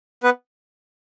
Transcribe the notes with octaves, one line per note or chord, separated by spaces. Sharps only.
B3 B4